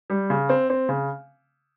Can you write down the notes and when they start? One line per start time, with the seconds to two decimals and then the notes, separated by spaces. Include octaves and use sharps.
0.10 G3
0.30 C#3
0.49 C4
0.70 C4
0.89 C#3